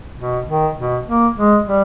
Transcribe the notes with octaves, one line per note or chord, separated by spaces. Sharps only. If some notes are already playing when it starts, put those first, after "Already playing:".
B2
D#3
B2
A#3
G#3
G3